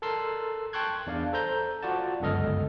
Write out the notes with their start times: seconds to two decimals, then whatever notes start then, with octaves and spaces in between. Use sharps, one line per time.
0.02 A4 A#4 A5 C6 E6 C7
0.73 G5 A5 C6 C#6 F#6 G#6
1.07 E2 D4 D5 F5
1.33 A4 C5 A#5 G6
1.83 F4 F#4 D5 F#5 A5
2.20 G1 C#2 F#2 A4 D#5 F6